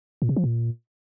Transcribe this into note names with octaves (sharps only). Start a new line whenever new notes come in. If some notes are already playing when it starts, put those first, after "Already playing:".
A#2
C3
F3
A#2